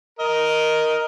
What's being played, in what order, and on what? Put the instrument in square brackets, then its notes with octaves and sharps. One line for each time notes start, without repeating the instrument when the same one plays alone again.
[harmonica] A#4 D#5